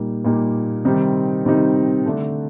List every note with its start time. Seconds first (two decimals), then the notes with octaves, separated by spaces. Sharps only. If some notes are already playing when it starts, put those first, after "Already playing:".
Already playing: A#2 G3 A#3 D#4
0.24 A#2 G3 A#3 D#4
0.85 C3 D#3 G3 C4 D#4
1.45 C3 D#3 G3 C4 D#4
2.05 D3 A3 D4